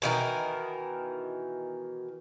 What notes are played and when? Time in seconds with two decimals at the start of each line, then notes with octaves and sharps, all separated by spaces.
0.02 B2 D#3 E3 A#4